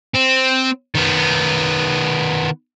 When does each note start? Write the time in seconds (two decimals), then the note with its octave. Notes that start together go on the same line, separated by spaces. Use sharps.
0.14 C4
0.95 D#3 B3